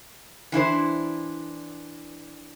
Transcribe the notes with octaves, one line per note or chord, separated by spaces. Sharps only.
E3 D4 E4 C5